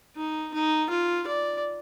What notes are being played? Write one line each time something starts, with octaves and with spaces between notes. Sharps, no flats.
D#4
D#4
F4
D5